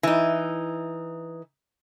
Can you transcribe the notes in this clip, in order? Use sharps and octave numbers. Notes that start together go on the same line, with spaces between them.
E3 D#4